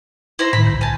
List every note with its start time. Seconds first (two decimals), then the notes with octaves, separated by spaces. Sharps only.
0.39 E4 C5 A#5
0.53 A2 D#3 B5
0.66 G1 C2 G6
0.81 G#5 A5